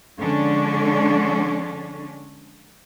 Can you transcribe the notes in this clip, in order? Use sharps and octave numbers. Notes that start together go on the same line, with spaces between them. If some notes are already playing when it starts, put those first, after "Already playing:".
D3 F3 G#3 C#4 D4